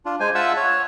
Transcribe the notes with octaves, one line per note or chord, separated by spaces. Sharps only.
D4 F4
G#3 C5 G#5
F4 E5 F#5 A5 E6
C#5